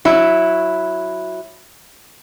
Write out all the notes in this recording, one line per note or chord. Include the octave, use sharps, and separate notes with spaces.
F#3 E4